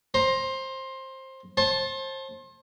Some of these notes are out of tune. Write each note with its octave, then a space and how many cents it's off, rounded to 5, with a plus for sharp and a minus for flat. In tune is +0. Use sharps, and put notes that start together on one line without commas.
C5 +15 A#5 +10
C5 +30 A5 -10